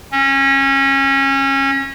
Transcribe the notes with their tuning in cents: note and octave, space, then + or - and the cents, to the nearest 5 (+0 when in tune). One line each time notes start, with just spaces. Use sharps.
C#4 -25